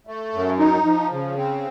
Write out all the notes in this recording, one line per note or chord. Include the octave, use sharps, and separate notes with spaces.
A3
F#2
D#4
F3
C#3
C4